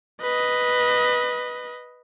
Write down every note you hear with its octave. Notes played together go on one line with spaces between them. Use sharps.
B4 D#5